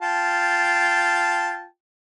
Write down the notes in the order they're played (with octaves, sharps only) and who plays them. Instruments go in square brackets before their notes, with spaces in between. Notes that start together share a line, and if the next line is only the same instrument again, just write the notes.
[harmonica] F4 G5 A5